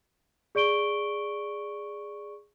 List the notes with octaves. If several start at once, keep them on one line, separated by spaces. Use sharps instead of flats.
G#4 D5 C#6 D7 G7